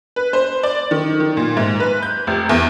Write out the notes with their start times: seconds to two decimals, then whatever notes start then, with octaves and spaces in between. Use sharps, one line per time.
0.16 B4
0.33 C5
0.63 D5
0.91 D#3
1.20 D#3
1.37 A#2
1.57 G#2
1.80 B4
2.03 G6
2.27 F1
2.49 E2